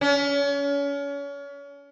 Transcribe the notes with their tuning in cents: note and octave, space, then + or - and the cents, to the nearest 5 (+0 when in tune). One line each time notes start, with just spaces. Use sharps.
C#4 +35